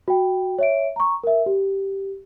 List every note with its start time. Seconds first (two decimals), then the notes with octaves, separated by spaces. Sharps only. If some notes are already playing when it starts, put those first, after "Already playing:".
0.08 F#4 G5
0.59 C#5 E5 D7
0.96 A#5 C#6
1.24 A#4 E5
1.46 G4